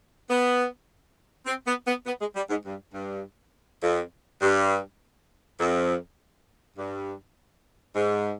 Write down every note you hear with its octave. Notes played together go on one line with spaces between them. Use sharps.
B3
C4
B3
B3
B3
G#3
G3
G#2
G2
G2
F2
G2
F2
G2
G#2